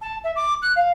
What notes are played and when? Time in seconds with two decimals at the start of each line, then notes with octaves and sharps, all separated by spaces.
0.01 A5
0.23 E5
0.35 D6
0.62 F#6
0.75 F5